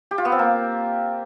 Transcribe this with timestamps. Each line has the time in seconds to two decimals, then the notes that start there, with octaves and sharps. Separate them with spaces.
0.11 G4
0.18 F4
0.25 B3
0.32 C4
0.39 A#3